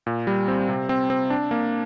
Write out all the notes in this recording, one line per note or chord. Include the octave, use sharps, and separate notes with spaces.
A#2
G3
C4
C3
C4
C4
D4
A#3